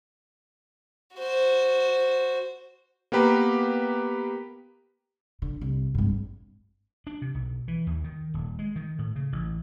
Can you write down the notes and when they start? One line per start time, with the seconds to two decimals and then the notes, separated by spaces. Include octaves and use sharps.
1.16 F#4 C5
3.12 A#3 B3 G4 B4 A#5
5.42 D3
5.61 C2
5.95 G#1 G2
7.07 D4
7.22 C3
7.35 B1
7.68 E3
7.87 D#2
8.04 D#3
8.34 D#1
8.59 G#3
8.76 D#3
8.99 A2
9.16 C#3
9.32 A1